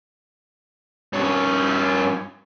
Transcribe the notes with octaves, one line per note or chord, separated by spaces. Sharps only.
G2 C#4